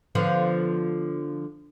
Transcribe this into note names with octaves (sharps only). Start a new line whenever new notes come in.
D3 F3 B3